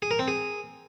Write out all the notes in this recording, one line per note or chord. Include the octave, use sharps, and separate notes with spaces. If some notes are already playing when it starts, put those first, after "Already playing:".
G#4
A#4
C4
G#4